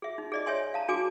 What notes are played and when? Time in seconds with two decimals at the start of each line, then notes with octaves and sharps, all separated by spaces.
0.02 G#4 E5
0.18 D#4
0.32 G#4 D5 D#5
0.46 C#5 E5 G#5 C6
0.74 F5 A5 A#5
0.88 D4 F#4 G#4 G#5 D6